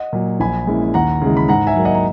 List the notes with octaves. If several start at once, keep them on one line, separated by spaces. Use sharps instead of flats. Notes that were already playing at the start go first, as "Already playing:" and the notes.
Already playing: D#5 F#5
A#2 F#3
A#1 G#5 B5
A#2 G#3 C#4 E4
D#2 F#5 A#5
C#3 E3 G#3
B5
G#2 F#5 A#5
E5 G#5
F#3 A#3
D#5 F#5
A#5